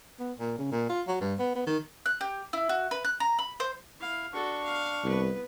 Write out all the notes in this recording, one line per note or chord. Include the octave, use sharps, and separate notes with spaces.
B3
A#2
C#3
A#2
F4
F#3
G2
B3
B3
D#3
F#6
G4
E4
F#4
B4
F#6
A#5
B5
C5
E4 F5
D4 F#4 A4 C#6
F5
C2 B3 B4